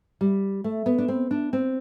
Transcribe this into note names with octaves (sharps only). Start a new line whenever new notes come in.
G3
A3
B3
D4
C4
D4
C4